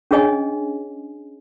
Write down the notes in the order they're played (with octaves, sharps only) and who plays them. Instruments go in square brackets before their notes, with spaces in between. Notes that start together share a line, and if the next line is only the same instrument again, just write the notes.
[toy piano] C#4 D4 G#4 C#5 D#5 G#5